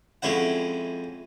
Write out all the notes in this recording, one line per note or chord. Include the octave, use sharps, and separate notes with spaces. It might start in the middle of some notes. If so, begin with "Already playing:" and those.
F2 G#3 C#4 E4 F#5